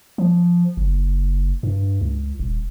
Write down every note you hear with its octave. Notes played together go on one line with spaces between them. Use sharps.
F3
F#1
G2
C#2
D#1